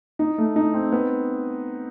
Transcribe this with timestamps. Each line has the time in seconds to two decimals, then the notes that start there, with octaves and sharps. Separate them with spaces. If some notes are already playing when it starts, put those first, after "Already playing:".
0.19 D#4
0.38 A3
0.56 D#4
0.74 C4
0.92 B3